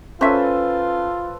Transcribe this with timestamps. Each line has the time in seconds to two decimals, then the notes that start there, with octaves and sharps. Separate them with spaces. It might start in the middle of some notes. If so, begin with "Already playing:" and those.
0.21 C#4 F4 A4 B4 C5 E5